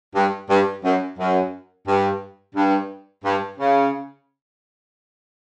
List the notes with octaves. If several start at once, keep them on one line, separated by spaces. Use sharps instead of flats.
G2
G2
F#2
F#2
G2
G2
G2
C#3